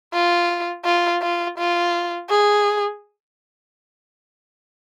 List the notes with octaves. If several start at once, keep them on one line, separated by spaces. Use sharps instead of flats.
F4
F4
F4
F4
G#4